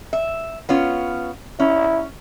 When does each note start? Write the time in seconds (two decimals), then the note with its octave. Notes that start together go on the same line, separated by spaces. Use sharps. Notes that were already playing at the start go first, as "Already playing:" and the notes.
0.13 E5
0.69 B3 C#4 F4
1.60 C#4 E4